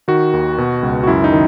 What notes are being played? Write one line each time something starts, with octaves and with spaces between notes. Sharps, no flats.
D#3 F#4
D#2
B2
C#2
F#4
F#2 E4
D#4
D#3